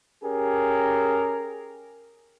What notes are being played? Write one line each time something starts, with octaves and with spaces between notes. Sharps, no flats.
C#4 G4 G#4 A#4